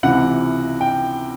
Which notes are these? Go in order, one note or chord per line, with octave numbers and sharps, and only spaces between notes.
C#2 C3 E3 F#5
G5